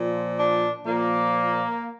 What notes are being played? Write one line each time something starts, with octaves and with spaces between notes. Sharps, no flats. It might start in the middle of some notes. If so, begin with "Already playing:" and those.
Already playing: A#2 F3
D4
A#2 F3 A#3